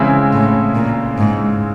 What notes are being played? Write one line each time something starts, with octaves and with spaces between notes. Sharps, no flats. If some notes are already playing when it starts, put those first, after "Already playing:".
Already playing: C#3 E3 G#3 C4 E4
A2
A#2
G#2